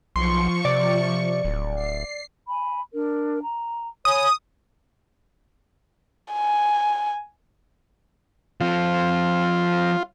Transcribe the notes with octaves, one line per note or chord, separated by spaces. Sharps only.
B1 F3 C6 C#6 C#7
C3 D5
D1
C7
G#5 B5
D4 A#4
A#5
C#5 G#5 B5 D#6
G#5
F3 C4 F4